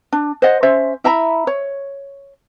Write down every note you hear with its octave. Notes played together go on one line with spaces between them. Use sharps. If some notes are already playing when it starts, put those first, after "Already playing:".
D4
C5 D#5 F#5
C#4 C5 E5
E4 E5 A#5 B5
C#5